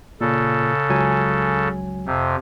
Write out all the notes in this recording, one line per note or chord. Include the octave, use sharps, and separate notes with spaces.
A#2 C#3 A4
C#2 F#3 G#5
F2 C3